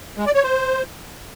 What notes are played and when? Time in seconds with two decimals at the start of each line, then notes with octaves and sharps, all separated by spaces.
0.18 G#3
0.26 D5
0.35 C#5
0.43 C5